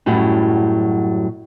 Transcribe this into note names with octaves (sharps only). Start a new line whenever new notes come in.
F#2 A2 F#3 G3